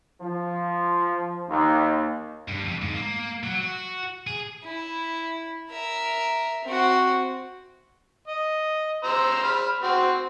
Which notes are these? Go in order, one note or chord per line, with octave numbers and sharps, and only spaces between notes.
F3
D#2
G2
F2
G#2
A#3
F#3
F#4
G#4
E4
A#4 E5
C4 F#4
D#5
C5 A#5 E6
B5 F6
C4 F#4